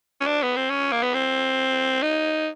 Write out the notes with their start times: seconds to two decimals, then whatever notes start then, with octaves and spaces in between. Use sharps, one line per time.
0.21 C#4
0.27 D4
0.43 B3
0.56 C4
0.70 C#4
0.92 A#3
1.03 B3
1.14 C4
2.02 D#4